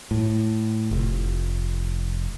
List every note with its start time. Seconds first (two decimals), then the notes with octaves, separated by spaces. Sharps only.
0.11 A2
0.91 F1